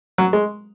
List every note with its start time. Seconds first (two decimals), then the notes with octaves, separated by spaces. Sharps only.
0.18 F#3
0.33 G#3